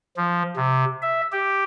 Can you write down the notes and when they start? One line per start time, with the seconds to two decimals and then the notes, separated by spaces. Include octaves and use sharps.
0.17 F3
0.56 C3
1.02 E5
1.32 G4